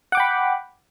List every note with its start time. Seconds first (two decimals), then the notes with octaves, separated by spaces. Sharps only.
0.12 F#5
0.15 D6
0.17 G5
0.20 B5